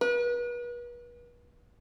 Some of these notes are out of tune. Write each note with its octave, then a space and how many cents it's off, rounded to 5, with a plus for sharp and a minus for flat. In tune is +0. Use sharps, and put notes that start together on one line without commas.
B4 -40